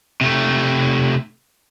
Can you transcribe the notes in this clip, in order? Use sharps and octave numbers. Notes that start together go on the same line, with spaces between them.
C3 A3